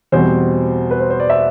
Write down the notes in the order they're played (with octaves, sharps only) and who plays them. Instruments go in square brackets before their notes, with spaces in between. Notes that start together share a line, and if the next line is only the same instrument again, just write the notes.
[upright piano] E2 B2 G3 C4 C5
B4
C5
C5
D5
E5